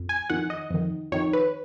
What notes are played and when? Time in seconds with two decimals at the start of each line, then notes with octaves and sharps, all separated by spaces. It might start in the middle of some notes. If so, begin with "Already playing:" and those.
Already playing: F2
0.09 G#5
0.30 F2 D#3 F#5
0.50 D#5
0.70 F2 D#3
1.12 F2 D#3 C#5
1.33 B4